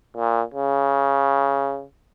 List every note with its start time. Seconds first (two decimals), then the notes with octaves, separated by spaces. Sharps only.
0.16 A#2
0.54 C#3